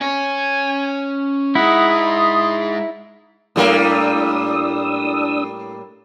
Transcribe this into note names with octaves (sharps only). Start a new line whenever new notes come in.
C#4 C#5 G#5
G#3 D#4 E4 F#5 D#6
C6
A2 G3 A#3 D4 D#6 E6